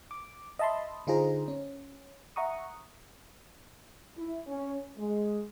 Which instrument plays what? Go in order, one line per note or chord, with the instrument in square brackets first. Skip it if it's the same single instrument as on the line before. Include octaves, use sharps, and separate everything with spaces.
[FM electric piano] D6
D#5 E5 A5 B5 C6
D3 D#4 F4 G#4 C5 A#5
C#4
E5 F#5 A#5 C#6 D#6
[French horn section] E4
C#4
G#3